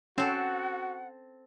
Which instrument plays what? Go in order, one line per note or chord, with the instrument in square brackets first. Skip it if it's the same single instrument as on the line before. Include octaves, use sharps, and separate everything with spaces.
[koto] C4 A4 [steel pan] C#4 [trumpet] F#4 [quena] F#5